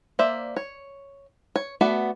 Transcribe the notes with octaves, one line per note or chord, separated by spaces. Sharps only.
A#3 C5 D5 E5
C#5
C#5
A3 B3 F#4 D5